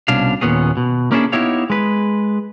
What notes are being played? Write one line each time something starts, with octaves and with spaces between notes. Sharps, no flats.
C2 B2 C#4 D4 F5
D#2 A#2 B3 C#4 G#4
B2
A#3 C#4 D4 E4 G#4 A4
B3 D#4 E4 G4 C#5 F5
G#3 B4